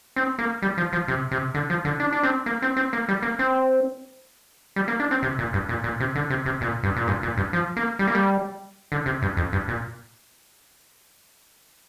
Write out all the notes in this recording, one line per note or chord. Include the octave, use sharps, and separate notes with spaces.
C4
A#3
G3
F3
F3
C3
C3
D3
F3
D3
D4
D4
C4
A#3
C4
C4
A#3
G3
A#3
C4
G3
A#3
D4
C4
C3
A#2
G2
A#2
A#2
C3
D3
C3
C3
A#2
G2
A#2
G2
A#2
G2
F3
A#3
G3
A#3
G3
D3
C3
G2
F2
G2
A#2